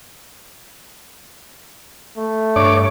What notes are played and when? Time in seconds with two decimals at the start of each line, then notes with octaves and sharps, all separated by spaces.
2.17 A3
2.56 G2 C#5 D6